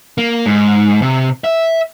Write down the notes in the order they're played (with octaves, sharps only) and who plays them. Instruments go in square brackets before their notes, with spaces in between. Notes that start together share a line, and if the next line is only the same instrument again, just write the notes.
[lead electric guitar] A#3
G#2
C3
E5